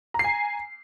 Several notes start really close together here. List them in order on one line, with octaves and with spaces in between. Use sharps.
A#5 C7 G#5